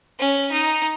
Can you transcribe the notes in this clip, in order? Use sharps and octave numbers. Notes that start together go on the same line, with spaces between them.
C#4
D#4